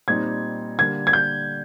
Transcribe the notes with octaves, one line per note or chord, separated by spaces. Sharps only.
A#2 G3 C4 D#4 G#6
D3 G3 A#3 G#6
G#6
G6